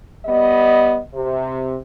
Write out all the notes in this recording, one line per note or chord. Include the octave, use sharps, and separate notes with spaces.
G3 B3 D#5
C3